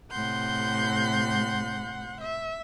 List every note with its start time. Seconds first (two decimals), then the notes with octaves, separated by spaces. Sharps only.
0.11 A2 C3 F#5 C6 G6
2.20 E5